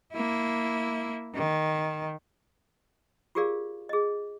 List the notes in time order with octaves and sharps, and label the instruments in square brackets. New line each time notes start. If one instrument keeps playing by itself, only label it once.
[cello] A#3 E4
D#3
[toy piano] F4 G4 G#4 A#4 D5 F5
G#4 D#5